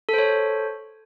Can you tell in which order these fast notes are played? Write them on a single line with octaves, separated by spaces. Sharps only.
A4 C5 C#5